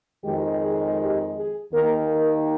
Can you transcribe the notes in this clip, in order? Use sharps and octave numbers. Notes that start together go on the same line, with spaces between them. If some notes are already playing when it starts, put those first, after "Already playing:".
F2 D#3 G#3 G4
G#4
G4
G#4
D#2 D#3 A#3 A#4
A#4